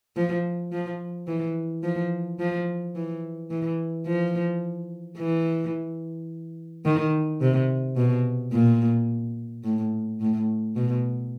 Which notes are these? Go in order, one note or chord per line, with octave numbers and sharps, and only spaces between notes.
F3
F3
E3
F3
F3
E3
E3
F3
E3
D#3
C3
B2
A#2
A2
A2
B2